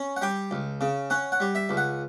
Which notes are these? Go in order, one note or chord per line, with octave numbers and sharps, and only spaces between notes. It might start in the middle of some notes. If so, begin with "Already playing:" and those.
Already playing: C#4
F#5
G3 G5
C#2
C#3
C#4 F#5
F#5
G3
E5
C#2
F#5